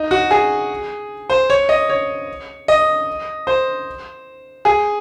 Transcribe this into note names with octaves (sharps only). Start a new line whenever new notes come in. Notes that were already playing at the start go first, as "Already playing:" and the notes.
Already playing: D#4
F#4
G#4
C5
C#5
D#5
C#5
D#5
C5
G#4